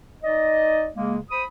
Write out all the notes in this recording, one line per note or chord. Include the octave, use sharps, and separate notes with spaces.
D#4 D5 D#5
C#3 G#3 A#3
C5 B5 D#6